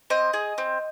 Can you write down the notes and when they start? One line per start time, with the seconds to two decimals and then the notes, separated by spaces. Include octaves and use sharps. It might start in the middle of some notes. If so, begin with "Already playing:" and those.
0.10 C4 D#5
0.33 G#4
0.58 C4